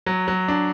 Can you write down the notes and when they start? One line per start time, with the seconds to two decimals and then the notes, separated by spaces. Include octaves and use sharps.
0.06 F#3
0.28 F#3
0.48 D4